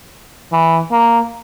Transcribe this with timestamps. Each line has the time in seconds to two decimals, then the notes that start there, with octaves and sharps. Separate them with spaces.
0.52 E3
0.92 A#3